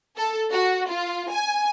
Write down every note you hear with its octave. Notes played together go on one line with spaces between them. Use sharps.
A4
F#4
F4
G#5